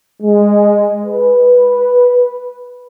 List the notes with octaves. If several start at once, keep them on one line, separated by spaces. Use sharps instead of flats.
G#3
B4